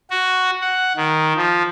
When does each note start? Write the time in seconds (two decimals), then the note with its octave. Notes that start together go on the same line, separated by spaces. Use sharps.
0.10 F#4
0.62 F#5
0.97 D#3
1.36 F3